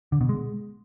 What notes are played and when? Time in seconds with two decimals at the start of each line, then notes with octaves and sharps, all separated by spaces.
0.12 D3
0.21 B2
0.29 G#3